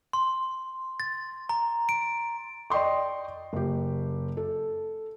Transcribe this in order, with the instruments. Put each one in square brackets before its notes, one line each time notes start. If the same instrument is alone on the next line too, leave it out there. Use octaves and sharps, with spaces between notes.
[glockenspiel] C6
A6
A#5
D7
[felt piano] D5 D#5 G5 C6 C#6
F#1 G4
A4